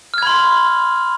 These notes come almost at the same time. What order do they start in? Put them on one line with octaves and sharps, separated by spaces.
F6 G#6 B5 C6